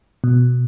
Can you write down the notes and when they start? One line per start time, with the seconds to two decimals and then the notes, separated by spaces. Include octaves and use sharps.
0.24 B2